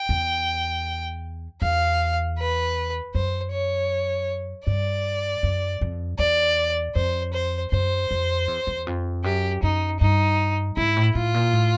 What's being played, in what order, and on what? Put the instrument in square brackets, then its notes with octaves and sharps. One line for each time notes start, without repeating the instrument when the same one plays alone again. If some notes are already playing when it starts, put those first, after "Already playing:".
Already playing: [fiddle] G5
[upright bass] E2
[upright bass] E2 [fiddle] F5
[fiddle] B4
[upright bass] F#2 [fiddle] C5
[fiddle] C#5
[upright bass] G2 [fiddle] D5
[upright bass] F#2
F2
[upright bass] E2 [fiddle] D5
[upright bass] F2 [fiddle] C5
[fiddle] C5
[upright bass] F#2 [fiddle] C5
[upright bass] F2
E2
E2
F2
[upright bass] F#2 [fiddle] G4
[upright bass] F#2 [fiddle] D#4
[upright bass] G2 [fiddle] D#4
[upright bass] G#2 [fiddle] E4
[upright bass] A2
[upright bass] A2 [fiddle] F4
[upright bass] A#2
A2